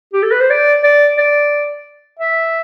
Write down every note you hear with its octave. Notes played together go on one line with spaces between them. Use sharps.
G4
A4
B4
C5
D5
D5
D5
E5